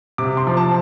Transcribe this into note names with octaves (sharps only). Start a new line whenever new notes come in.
C3 D6
C6
F3
A5